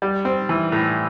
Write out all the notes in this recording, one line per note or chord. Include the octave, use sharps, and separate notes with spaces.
G3
C4
E3
A2